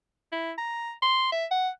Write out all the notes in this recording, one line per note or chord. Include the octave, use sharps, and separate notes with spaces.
E4
A#5
C6
E5
F#5